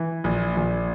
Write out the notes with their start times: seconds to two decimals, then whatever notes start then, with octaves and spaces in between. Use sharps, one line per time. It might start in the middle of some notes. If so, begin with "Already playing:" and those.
Already playing: E3
0.24 A#1
0.57 A#1